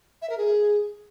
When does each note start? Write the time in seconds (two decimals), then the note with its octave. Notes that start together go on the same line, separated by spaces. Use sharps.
0.22 E5
0.30 A#4
0.37 G#4